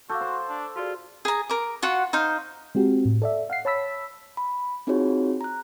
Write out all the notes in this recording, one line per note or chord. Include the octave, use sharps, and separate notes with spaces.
F#4 A4 F5 D6 G6
C5
D4
F4 F#4 G#4 D5
G#4 A#5
A#4 D6
F4 F#4 F#5
D#4 C5 F5
G#3 C4 F#4 G4
A2
A4 D5 E5
F5 F#5 C7
C#5 A5 B5 E6 B6
B5
C4 D#4 F4 F#4 G#4 C#5
A#5 F#6